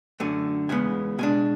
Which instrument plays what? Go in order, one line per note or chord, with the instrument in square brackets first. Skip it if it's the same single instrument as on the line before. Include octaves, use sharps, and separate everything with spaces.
[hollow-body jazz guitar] F#2 D3 A3 G#5
E2 C#3 G#3 B3 G#5
B2 G#3 D4 G#5